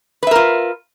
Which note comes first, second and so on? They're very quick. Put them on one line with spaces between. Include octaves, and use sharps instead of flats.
B4 E5 A#4 F4